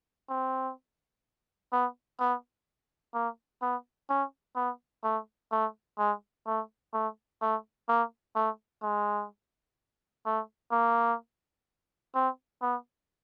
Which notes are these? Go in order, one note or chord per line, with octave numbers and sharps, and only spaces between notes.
C4
B3
B3
A#3
B3
C#4
B3
A3
A3
G#3
A3
A3
A3
A#3
A3
G#3
A3
A#3
C4
B3